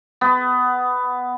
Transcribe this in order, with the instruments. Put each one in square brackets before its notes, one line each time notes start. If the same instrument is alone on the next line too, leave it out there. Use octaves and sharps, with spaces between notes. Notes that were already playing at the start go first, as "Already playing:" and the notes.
[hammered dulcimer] B3